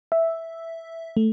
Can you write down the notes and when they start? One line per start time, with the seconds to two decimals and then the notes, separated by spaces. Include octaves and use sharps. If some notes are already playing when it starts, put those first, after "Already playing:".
0.12 E5
1.17 A3